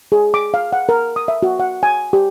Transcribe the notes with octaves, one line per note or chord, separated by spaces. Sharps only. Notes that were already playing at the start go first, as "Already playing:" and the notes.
G#4
D6
F5
F#5
A#4
D#6
E5
F#4
F#5
G#5
G4